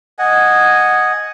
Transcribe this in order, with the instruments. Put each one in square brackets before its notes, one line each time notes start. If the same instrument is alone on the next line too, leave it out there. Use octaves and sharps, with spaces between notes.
[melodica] D#5 F#5 G#5